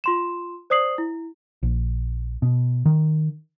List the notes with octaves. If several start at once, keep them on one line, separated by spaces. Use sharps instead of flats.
F4 C6 E7
C5 D5 D#6 C7 F#7
E4
A#1
B2
D#3